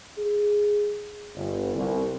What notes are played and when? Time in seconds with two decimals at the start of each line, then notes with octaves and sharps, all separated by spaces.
0.17 G#4
1.36 G1
1.75 C2